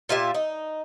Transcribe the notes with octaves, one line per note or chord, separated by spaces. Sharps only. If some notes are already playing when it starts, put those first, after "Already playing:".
A#2 F4 G4 E5
D#4